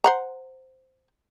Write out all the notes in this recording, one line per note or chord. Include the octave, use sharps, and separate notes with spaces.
C5 F#5 A#5